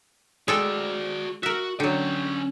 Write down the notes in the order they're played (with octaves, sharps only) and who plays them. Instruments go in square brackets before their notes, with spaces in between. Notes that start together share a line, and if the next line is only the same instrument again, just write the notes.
[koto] G#3 A4 G5 [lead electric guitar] F#4 D5
[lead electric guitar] F#4 [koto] A#4 E5
[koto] D3 F#3 [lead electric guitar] C#4 G5